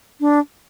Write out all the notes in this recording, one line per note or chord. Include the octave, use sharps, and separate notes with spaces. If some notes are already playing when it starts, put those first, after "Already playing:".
D4